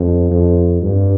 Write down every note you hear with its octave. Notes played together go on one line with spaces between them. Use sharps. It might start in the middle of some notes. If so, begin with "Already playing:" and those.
Already playing: F2
F2
G2